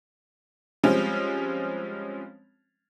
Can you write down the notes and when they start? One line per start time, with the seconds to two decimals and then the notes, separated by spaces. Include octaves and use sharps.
0.83 F3 G3 G#3 C4 C#4